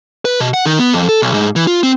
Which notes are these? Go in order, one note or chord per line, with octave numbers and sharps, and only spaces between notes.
B4
B2
F#5
D#3
B3
F2
A4
B1
G#2
E3
F4
C4